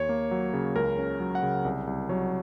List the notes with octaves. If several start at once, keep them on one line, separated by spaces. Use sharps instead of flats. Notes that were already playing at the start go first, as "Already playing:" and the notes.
Already playing: D#2 C#5
A#3
F#3
C#3
C#2 A#4
C#4
F#3
F#5
C#3
C2
C2
F#3 C#5